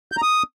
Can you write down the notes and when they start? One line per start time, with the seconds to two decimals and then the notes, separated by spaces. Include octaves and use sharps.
0.12 G6
0.17 A#5
0.22 D#6